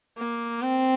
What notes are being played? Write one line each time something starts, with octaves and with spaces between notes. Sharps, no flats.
A#3
C4